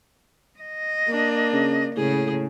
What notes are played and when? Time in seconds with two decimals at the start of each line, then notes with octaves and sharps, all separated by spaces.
0.59 D#5
1.07 A#3 D4
1.53 C#3
1.96 A2 C#3 G#4